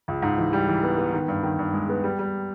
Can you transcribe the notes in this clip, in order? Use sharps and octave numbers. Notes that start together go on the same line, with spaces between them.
C#2
G#2
E3
G3
E3
B3
B3
D#3
G2
D#3
G2
G#3
B3
G3
G3